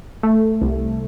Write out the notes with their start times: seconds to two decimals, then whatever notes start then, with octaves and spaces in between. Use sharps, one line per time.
0.23 A3
0.62 C2